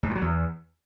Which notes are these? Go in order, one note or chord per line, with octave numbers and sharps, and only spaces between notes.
G#2
G2
F#3
E2